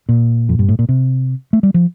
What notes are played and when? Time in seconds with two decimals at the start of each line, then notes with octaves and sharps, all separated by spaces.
0.09 A#2
0.49 F2
0.59 G2
0.69 A2
0.79 A#2
0.89 C3
1.53 A3
1.63 G3
1.74 F3